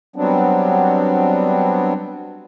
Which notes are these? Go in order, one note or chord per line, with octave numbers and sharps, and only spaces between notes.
F#3 G3 B3 C4 D4